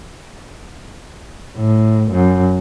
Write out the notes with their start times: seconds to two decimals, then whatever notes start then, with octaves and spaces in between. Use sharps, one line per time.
1.57 A2
2.12 F#2